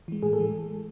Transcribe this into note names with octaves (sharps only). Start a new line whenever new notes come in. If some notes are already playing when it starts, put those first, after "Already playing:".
E3 G#3
A2 G#4
A4
E3 G#3